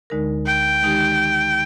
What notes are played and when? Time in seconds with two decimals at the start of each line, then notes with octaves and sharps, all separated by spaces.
0.10 D2 D3 G#3 D#4 A#4
0.46 G5
0.82 D#3 G#3 D#4 G4